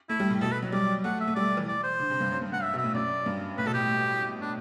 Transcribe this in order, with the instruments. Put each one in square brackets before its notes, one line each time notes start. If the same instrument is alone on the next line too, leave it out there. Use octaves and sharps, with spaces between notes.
[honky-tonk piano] A3 [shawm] E4
[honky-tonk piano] G3
A2
[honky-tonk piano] B2 [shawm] A4
[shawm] B4
[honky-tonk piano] F#3
[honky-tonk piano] G3 [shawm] D5
[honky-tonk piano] A3 [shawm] F#5
[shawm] E5
[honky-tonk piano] A3
[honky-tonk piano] G3 [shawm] D5
[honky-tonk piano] E3
[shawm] D5
C5
[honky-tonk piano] D3
C3
G2
F#2
G2
[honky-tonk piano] G2 [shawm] F#5
[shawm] E5
[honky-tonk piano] B2
[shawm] E5
[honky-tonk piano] A2
[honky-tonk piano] F#2 [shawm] D5
[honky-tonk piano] G2
[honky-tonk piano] A2 [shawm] B4
[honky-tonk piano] B2 [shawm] A4
[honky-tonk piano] A2 [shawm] G4
[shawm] D4